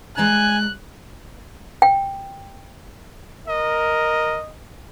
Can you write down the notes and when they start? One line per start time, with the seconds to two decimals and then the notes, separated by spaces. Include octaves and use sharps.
0.18 G#3 D5 G#5 A#5 F#6
1.82 G5
3.48 A#4 D#5